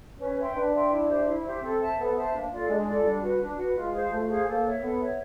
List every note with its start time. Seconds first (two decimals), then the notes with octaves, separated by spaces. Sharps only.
0.20 C#4 B4
0.39 E5 G5 C6
0.56 D4 B4
0.74 E5 G5 C6
0.91 E4
1.09 G4 C5 E5
1.27 E4
1.44 G4 C5 E5
1.62 C4 A4
1.80 C5 E5 A5
1.98 B3 A4
2.15 C5 E5 A5
2.34 A#3 D4
2.51 F4 A4 D5
2.69 G#3 D4
2.87 F4 A4 D5
3.05 G3 D4
3.22 F#4 B4
3.40 D4
3.58 F#4 B4
3.76 G#3 F4
3.93 G#4 C5 F5
4.11 A3 F4
4.29 G#4 C5 F5
4.47 A#3 A4
4.65 C#5 E5
4.82 B3 A4
5.00 C#5 E5